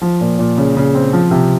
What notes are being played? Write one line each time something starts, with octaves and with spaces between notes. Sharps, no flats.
F3
A#2
A#2
C#3
C#3
C4
F3
C3